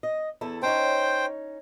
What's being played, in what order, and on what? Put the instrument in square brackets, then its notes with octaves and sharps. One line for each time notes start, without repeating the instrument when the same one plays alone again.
[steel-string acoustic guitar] D#5
E2 E4 A4
[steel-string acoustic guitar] C#4 D#4 C#5 [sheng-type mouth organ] C5 G5